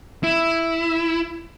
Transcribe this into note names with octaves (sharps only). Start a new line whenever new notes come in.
E4